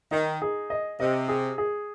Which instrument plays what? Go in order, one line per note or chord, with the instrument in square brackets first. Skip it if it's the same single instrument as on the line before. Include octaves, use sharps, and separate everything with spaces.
[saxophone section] D#3 [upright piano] D#4
[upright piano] G#4
D#5
[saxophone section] C3 [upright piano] D#5
[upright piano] G#4
G#4